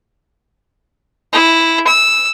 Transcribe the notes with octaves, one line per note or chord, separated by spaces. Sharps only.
E4
E6